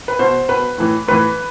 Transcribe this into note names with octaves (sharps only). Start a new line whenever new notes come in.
B4
B2 C5
B2 B4
A2 E3
A2 E3 B4